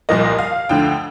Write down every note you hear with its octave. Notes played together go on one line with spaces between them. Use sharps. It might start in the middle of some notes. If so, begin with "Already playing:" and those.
C2 A#2 F3 A#3 D#5
F5
D2 D3 F3 G5